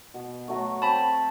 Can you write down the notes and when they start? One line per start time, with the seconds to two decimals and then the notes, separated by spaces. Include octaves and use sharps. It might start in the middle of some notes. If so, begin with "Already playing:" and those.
0.14 B2
0.48 F#3 A3
0.82 C4 A5 B5